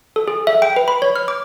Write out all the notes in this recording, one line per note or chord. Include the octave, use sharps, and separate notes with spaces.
A4
G#4
E5
G5
B4
B5
C#5
F6
D6